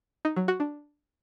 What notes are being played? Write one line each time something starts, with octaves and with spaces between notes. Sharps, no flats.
D#4
F#3
F#4
D4